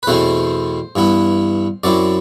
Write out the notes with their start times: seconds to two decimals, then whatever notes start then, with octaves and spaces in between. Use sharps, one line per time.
0.03 B4
0.07 E2 B2 A3 C4 E4 C5
0.96 G2 E3 B3 E4
1.84 F#2 F#3 C4 E4 D5